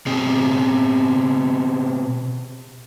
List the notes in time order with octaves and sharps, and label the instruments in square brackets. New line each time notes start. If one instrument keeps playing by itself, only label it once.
[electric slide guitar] B2 C4 G#4